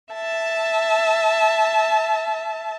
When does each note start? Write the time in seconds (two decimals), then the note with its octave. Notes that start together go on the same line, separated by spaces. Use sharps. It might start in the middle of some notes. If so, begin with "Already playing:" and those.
0.13 E5 A5